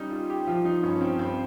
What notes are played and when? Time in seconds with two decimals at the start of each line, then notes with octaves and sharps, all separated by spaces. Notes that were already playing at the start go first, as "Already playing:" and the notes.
Already playing: G3 C#4 D#4
0.11 G3 F4
0.30 G4
0.47 F3 F4
0.65 D#4
0.83 G2 C#4
0.96 C#4
1.01 C4
1.19 G2 C4